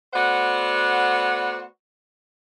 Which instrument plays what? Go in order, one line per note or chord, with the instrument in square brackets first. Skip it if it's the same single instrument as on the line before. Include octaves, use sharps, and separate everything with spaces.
[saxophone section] A3 B3 F#4 C5 D5 F#5